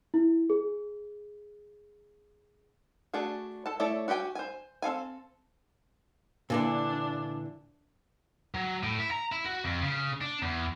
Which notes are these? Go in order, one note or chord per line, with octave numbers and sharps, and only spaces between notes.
E4
G#4
A3 D4 F#4 G#4
A4 A5
A3 E4 A4 C#5 D5
F#4 G4 A4 G5 G#5
C5 G#5
C4 A4 F5 G#5
A#2 D3 E3 D4
F#3
A2
E4
A#5
E4
F#4
F2
C#3
D4
E2